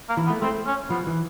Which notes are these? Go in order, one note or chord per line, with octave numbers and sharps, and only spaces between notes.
A#3
E3
B3
A3
A3 C4
C#4
F3 B3
E3